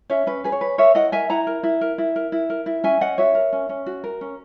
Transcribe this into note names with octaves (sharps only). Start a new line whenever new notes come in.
C#4 C#5 E5
C#4 B4
G#4 B4
C#5
B4
A#4 C#5 E5
E4 D#5 F#5
A#4 E5 G#5
E4 F#5 A#5
A#4
E4
A#4
E4
A#4
E4
A#4
E4
C#4 E5 G#5
C#4 D#5 F#5
F#4 C#5 E5
A#4
C#4
C#4
F#4
A#4
C#4